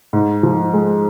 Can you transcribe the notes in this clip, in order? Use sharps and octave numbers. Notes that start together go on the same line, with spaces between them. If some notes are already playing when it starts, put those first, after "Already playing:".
G#2
F3
G#3